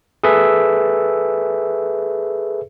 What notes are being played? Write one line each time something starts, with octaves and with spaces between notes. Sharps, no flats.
G#4 A4 B4 E5